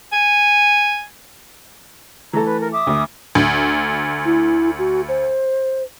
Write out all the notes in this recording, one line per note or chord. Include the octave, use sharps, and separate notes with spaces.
G#5
E3 A3 A4 A#5
B4
A#4
E5 D6 D#6
D2
D2
E4
F#4
C5